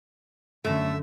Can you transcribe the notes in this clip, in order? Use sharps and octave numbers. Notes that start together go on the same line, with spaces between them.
F#2 D3 A3 E5 A#6 D#7